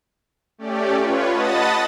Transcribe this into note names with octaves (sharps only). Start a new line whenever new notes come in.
A3 C#4 G4 D5
F4 B4 C#5
D#5 F#5 A5 B5 D#6 A6